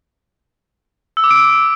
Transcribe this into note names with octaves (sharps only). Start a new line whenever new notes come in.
E6
D6
D7